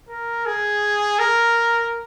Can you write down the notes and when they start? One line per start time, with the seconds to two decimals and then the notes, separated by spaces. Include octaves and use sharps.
0.09 A#4
0.46 G#4
1.19 A#4